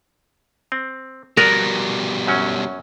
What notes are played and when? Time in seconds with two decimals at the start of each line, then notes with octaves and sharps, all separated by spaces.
0.72 C4
1.37 B2 G3 B3 A#4 D5
2.27 F#2 F#3 C#4